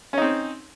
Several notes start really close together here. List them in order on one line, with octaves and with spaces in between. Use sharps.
C#4 D#4 C4